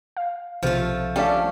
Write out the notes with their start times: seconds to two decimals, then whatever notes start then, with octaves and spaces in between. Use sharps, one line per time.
0.17 F5
0.63 B1 C3 F3 A3 F4
1.16 G3 A3 C#4 D4 F5 G5 A5 D6